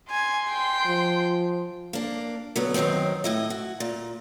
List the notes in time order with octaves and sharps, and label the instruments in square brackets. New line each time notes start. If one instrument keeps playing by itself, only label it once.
[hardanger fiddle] G#5 [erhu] C6
[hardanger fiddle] G5
[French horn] F3
[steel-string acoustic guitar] A#3 D4
D3 F#3 B3
F#2 D#3 E3 F#3 C4
A2 E4 D#5
F#4
A#2